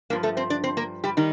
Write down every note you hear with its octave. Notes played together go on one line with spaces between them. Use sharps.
G2 F3 A#3
A3 A4
C4 C5
D4 D5
C4 C5
A#3 A#4
G3 G4
D#3 G3 D#4